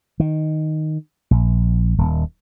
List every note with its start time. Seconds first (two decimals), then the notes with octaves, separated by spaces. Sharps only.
0.20 D#3
1.31 A#1
1.98 D#1